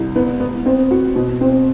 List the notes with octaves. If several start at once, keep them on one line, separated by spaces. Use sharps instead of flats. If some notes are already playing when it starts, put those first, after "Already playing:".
Already playing: C2
B3
B3
C4
F#4
B2
C4